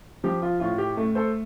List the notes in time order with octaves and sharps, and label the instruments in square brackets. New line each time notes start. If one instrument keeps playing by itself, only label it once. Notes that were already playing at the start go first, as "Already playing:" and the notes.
[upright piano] F3 [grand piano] G4
[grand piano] F4
[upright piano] A2 [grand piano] F4
[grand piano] G4
[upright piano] A3
[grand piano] A4 C5